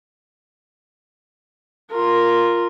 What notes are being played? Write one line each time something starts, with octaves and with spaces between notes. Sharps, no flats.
F4 A#4